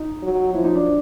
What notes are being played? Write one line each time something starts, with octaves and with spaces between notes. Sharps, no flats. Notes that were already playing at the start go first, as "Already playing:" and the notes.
Already playing: D#4
F#3
F3 E4
D#4
D4